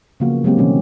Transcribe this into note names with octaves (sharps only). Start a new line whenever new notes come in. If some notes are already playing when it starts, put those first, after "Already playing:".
C#3 F3 F#3 A#3 B3 F#4
F#3 G#3 A#3 C4 G4
B2 D#3 E3 G3 C#4 F#4